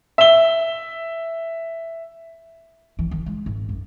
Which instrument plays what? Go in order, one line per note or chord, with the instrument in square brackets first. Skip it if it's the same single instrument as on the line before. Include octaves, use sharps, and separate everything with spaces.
[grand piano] E5 G7
[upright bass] E3
D#3
G#3
G#1
F#2